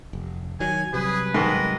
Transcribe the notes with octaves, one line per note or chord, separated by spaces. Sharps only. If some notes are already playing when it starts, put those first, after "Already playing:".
F1
D#3 F#3 G#5
C3 F#3 G3 G#4 B4
G#2 D#3 A#4